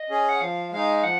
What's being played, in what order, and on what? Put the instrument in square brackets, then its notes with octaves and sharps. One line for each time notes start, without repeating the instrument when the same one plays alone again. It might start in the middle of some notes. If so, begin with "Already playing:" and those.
Already playing: [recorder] D#5
[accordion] C#4 G#4
[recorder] F#5
[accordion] F3 [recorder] F5
[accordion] G#3 D#4 [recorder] F5
[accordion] F3 [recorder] F#5